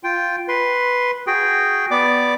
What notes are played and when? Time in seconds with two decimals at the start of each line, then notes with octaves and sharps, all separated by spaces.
0.04 F4 G5
0.48 B4 C6
1.27 F#4 G#4 G5
1.91 B3 D5 D6